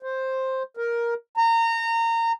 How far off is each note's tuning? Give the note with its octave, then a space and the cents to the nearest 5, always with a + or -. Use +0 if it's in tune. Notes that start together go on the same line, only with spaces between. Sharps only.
C5 +5
A#4 +10
A#5 -25